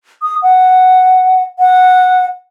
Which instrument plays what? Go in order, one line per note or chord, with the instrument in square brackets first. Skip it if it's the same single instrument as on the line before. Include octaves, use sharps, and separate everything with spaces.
[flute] D#6
F#5
F#5